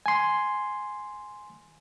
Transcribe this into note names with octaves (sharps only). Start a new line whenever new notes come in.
G#5 C6